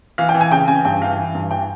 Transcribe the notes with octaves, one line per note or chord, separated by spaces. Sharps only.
E3 F5
G5
E3
G#5
C#3 G5
C#3 G#5
G2 G5
E3 F5
E3
G2
E3 G5